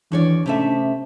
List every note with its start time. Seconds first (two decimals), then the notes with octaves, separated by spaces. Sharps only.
0.12 D#2 E3 D4 C#5 D5
0.46 C3 A3 C#4 E5